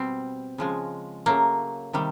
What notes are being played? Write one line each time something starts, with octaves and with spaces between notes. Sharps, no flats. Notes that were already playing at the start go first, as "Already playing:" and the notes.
Already playing: B2 G3 C4
C#3 F3 G#3
C#3 F#3 A3 A#3
C3 D#3 G3